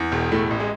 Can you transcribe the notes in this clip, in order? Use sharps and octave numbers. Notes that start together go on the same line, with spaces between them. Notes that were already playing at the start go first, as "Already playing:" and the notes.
Already playing: E2
E1
A2 A3
A1
G#3